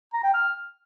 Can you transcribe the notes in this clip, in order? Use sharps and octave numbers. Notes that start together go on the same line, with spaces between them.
A#5
G5
F6